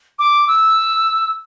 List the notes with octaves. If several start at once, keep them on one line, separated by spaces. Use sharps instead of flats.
D6
E6